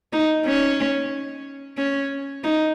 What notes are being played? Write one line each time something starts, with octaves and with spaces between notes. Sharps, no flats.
D#4
C#4
C#4
D#4